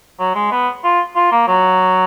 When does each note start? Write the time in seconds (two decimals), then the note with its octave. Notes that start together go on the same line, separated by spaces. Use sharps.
0.19 F#3
0.35 G#3
0.52 B3
0.83 F4
1.15 F4
1.32 A#3
1.47 F#3